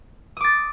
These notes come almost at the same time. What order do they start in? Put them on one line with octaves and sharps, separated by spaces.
D#6 D6 A6